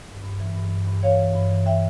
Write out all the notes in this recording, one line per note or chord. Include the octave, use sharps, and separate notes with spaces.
G2
G2
E3
G2
G2
G2
E3 C#5 F5
E3
G2
E3
E3 E5 G5